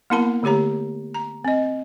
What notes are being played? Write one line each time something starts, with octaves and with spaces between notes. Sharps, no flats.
A#3 B3 E4 A#4 A5 B5
D3 A3 G4 C#5 A#5
A#5
C4 D#5